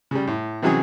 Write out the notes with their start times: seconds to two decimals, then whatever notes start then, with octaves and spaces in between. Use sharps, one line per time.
0.11 C#3 G3
0.27 A2
0.62 C3 E3 F#3 C#4 G#4 D#6